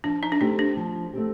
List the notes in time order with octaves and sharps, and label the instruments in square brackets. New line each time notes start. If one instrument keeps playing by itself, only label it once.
[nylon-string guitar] F3 [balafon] D4
[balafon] D#4
D4
[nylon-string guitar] A3 C4 G4 [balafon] D#4
[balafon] D4
[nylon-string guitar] F3
A3 C4 G4